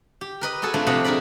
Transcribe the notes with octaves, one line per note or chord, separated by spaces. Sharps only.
G4
A#4 B4 D#5
B3 F#4 G#4 A4
A3 C4 D4 F4
F2 C3 G4 D#5 F#5
D4 G#4 A#4 D5 B5